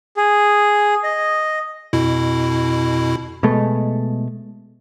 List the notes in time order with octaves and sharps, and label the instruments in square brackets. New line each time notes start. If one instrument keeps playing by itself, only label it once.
[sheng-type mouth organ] G#4
D#5
[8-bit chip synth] F2 B2 E4
[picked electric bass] B2 G#3 A3